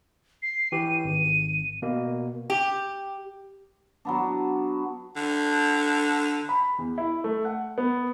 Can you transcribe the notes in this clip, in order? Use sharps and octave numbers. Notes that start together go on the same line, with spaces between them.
C7
E3 G4 D#7
G#1
B2 A#3
G4
F#3 B3 D4
D3
B5
E2
E4
A3
F#5
B3